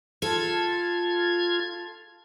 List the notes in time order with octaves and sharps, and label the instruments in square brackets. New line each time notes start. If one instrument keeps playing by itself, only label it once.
[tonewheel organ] F4 G#6 [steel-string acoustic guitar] A4